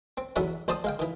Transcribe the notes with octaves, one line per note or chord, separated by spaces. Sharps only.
C4
B1 E2 C#4 F#4 E5 F#5
A#1 C5 D5 A5 C6 D#6
G#3 F5 G5
D#3 E3